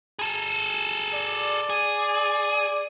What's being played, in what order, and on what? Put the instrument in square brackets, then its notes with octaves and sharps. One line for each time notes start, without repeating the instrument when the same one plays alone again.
[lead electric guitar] G#4 A4
[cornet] D5
[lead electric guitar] G#4